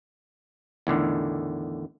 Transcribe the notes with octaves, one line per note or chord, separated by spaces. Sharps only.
E2 A2 D3 D#3